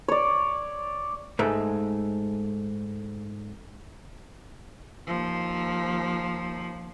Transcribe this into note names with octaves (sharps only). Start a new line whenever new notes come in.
C#5 D5
G#2 G#3 A3
D#2 F3